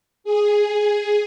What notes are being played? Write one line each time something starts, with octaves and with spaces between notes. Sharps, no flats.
G#4